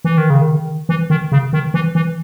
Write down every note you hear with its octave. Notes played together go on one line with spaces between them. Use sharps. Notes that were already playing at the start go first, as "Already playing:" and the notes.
E3
D#3
C#3
D#3
E3
D#3
C#3
D#3
E3
E3